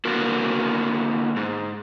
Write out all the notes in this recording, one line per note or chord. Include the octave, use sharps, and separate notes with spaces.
D3 A#3 B3 F#4 A#4
G#2